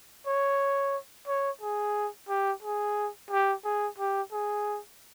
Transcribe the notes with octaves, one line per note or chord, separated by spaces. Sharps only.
C#5
C#5
G#4
G4
G#4
G4
G#4
G4
G#4